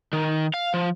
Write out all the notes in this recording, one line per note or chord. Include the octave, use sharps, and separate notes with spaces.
D#3
F5
F3